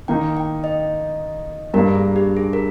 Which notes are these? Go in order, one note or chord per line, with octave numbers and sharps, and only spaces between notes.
D#3 A#3 D#4 G5
G5
D#5
G2 G3 A#3 A#4
G#4
G4
G#4
A#4